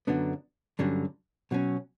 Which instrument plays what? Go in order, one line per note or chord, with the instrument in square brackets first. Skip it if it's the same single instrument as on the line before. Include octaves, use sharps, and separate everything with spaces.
[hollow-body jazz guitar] F#2 D3 F#3 B3 D4
G2 D3 F#3 C#4
B2 F#3 C#4